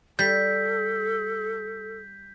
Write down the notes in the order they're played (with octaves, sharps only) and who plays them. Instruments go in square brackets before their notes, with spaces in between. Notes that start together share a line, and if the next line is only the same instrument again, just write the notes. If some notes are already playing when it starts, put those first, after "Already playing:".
[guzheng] G3 [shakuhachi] A4 [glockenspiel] G6 B6